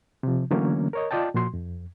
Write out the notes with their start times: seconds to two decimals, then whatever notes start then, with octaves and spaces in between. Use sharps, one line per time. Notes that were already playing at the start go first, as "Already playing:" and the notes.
0.23 C3 F3
0.51 D3 E3 F#3 A3 A#3 C#4
0.93 A#4 C#5 D#5
1.11 F4 D5 D#5 G5 A5
1.34 A#2 F3 F#4 C6
1.54 F2